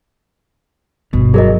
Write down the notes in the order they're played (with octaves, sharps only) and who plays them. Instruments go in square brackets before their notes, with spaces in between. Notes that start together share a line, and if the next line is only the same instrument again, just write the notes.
[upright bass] G1 [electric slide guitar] B2
[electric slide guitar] F#3 [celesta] G#4 A#4 D#5